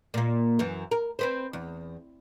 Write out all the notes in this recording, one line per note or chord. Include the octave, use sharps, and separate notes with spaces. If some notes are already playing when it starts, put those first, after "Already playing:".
A#2 A#3
F#2 E3
A#4
C4 B4 C5
E2